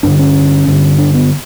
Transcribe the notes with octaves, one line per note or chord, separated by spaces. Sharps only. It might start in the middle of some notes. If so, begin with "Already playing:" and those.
G2 D3 D4
C#4
G2 D3
D4
B3